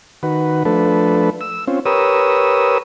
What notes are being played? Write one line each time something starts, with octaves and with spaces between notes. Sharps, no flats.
D#3 F#4 B4
F3 A3 D4 A4 B4
E6
C4 C#4 F4
G4 A#4 B4 C#5 D#6 E6